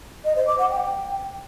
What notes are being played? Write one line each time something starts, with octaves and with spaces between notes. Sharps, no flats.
D#5
C5
D6
F#5
G5